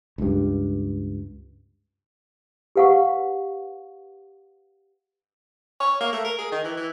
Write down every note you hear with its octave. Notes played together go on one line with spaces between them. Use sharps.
C#2 G2
G4 B4 F5 F#5 C#6
C#5
A#3
A3
A#4
G#4
D#3
E3
E3